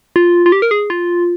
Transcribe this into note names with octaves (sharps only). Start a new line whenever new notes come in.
F4
F4
G4
A#4
G#4
F4